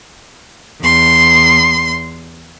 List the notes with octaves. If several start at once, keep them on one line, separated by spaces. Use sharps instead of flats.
E2 C6